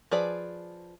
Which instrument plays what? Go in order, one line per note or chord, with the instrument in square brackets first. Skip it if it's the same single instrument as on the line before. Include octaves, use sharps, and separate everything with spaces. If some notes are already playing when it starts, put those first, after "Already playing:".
[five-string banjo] F3 G#4 B4 D5